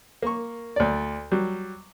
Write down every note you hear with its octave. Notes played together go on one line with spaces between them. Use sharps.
A#3 C#6
D2 D5
F#3 G3